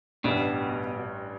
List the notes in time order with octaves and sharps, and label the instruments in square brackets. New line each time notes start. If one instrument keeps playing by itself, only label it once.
[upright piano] A1 G2 G3 D4 [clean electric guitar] B2